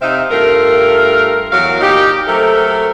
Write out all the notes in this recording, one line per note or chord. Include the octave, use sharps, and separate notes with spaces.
C3 C4 D#4 E5 F5
G2 A3 F4 A#4
E2 F#3 A#4 F5
A#2 D#4 G4
F#3 A3 C4 A4 A#4